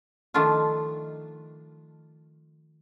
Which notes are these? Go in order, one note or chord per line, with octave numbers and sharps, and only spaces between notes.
D#3 F3 A3 D4 F4